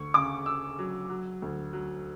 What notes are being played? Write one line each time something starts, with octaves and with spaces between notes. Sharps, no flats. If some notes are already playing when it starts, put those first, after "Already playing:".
Already playing: D2 C#6
C#3 D6
C#3 E6
F#3
F#3
D2
F#3